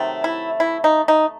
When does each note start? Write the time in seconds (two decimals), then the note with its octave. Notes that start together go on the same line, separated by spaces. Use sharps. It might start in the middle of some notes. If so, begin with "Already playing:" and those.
Already playing: C3 D#3 F#3 A3
0.24 E4
0.60 E4
0.84 D#4
1.08 D#4